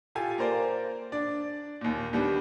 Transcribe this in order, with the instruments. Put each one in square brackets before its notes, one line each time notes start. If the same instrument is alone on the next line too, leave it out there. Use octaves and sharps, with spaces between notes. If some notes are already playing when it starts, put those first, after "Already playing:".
[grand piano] F4 G4 A4 G#5
A#3 A#4 C5 D5
D4 D5
D#2 A#2
D#2 G3 B3 D4